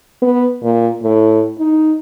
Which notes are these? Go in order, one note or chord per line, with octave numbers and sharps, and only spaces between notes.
B3
A#2
A2
D#4